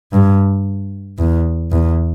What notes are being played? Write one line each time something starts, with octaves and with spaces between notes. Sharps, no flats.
G2
E2
E2